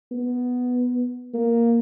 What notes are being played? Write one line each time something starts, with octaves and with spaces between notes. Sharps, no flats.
B3
A#3